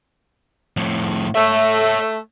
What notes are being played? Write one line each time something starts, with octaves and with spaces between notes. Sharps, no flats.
F2 A2
A3 C#5 E5